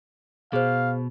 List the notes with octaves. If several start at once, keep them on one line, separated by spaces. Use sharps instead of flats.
B2 G#4 C5 F5